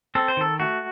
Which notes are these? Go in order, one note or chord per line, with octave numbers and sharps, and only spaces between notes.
C4 A4
C5
D#3 A4
A3 F#4